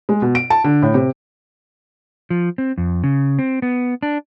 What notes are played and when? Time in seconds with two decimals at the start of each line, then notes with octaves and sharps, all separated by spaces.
0.09 G#3
0.22 B2
0.35 D7
0.50 A5
0.64 D3
0.82 A2
0.94 C3
2.30 F3
2.58 C4
2.78 F2
3.04 C#3
3.39 C4
3.62 B3
4.03 D4